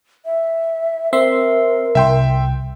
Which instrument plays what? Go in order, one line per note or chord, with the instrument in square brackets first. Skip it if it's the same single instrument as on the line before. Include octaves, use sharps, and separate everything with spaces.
[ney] E5
[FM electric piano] C4 E5 C6 [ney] A#4
[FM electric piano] C2 [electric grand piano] E5 G5 C6